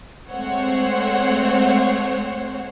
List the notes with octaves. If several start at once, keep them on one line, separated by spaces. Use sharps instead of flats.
G#3 A3 C4 C5 C#5 F#5